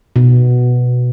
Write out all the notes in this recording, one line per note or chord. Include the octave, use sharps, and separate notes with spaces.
B2